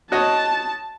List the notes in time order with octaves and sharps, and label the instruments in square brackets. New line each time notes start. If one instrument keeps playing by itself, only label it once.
[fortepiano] F#4 C#5 D#5 [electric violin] A5